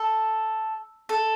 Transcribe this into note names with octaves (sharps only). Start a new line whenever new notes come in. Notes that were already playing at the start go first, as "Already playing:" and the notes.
Already playing: A4
A4